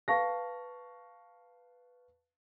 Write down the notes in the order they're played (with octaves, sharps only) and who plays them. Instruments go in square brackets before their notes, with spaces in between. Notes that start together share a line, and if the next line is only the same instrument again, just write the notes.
[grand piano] B4 F5 A5 C#6 A#6